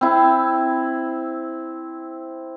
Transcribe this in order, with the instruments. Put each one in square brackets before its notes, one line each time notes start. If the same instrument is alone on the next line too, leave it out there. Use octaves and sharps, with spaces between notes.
[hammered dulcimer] C4 E4